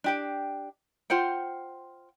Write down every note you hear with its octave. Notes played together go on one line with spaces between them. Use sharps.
D4 G4 G5
F4 C5 F#5 G5